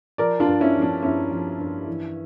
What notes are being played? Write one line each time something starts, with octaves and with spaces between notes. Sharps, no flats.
F3 A#4 D5
D4 F4
G2
C#4 E4
F3
D4
G2 C#4 E4
F3
G2
E3